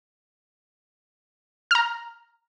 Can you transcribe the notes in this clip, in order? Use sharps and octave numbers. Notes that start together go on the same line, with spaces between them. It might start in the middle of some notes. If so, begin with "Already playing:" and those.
A#5 F6